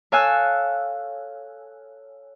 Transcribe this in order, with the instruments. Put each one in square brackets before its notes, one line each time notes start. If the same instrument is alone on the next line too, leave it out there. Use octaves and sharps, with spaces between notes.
[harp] A4 C#5 F5 G#5 E6 F#6